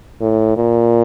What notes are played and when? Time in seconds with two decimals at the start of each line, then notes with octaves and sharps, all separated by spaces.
0.21 A2
0.57 A#2